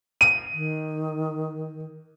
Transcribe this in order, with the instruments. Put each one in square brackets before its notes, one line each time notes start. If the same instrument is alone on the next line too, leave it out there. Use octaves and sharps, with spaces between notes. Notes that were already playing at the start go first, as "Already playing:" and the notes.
[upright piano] D#7
[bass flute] D#3